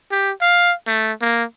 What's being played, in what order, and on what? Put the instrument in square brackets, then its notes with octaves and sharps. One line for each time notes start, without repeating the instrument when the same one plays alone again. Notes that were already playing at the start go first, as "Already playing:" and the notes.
[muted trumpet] G4
F5
A3
A#3